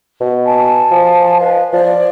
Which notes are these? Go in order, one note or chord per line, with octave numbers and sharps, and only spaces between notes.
B2
G#5 A5
F3
B4 D#5 F5
F3 D5